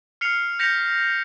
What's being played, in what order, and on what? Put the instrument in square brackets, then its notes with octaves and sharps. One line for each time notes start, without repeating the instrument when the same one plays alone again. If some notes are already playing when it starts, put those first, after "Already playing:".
[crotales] F6 C7 C#7 F7
G6 A#6 B6 C#7 F7